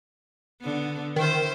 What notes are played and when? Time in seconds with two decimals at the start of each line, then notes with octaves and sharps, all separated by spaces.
0.61 D3 B3
1.16 D#3 E4 C5